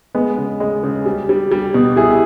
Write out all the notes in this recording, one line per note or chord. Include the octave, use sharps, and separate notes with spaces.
G#3 B3
C#3
G#3
C#3
G3
G3
G3
B2
G3 E4 G#4